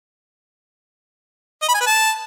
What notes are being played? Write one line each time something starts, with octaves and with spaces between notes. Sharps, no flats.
D#5
B5
G#5
B4
A5